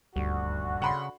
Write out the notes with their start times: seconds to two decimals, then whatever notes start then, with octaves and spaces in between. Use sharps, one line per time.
0.16 D#1 D2 G2 D3 G3 F#4
0.82 C#3 F#5 B5 C6